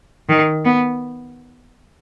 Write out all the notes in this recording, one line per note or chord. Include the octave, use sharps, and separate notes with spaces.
D#3
B3